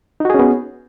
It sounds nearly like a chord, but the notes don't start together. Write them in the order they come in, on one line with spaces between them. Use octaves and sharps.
D#4 F#4 G#4 C#4 B3